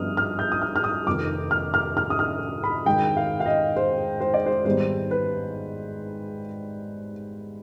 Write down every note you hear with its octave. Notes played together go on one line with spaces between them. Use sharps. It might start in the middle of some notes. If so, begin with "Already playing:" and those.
Already playing: G1 G2 F3 B3 D#6 F6
F6
G6
D#6
F6
F6
D#6
F1 F2 D#3 D6
F6
F6
F6
D#6
F6
B5
G#1 G#2 D#3 G5
F5
F5
D#5
C5
C5
D5
C5
G#1 G#2 G3 B3 C5
B4